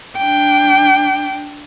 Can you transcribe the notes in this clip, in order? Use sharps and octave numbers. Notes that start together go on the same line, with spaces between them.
D4 G5